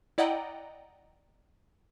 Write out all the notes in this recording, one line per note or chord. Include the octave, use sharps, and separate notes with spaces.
E4 D5 D#5 F#5 G5 A#5